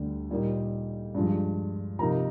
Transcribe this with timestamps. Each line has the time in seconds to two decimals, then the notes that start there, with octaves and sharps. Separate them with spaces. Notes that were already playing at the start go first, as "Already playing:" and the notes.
Already playing: D2 D3 G3
0.30 A#2 G3 A#3 D#4
1.15 G2 F3 G#3
1.99 C3 F3 A#3 D#4 A#5